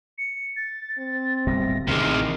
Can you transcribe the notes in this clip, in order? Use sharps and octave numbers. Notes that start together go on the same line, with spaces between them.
C#7
A6
C4 A6
D1 B2 G3 A#6
A1 C3 D#3 G#3 F6